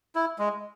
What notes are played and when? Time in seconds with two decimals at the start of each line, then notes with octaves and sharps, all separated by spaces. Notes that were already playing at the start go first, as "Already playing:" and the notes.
0.15 E4
0.39 G#3